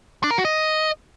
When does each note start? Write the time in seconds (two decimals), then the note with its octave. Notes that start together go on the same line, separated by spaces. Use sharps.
0.24 D4
0.31 A#4
0.38 F#4
0.45 D#5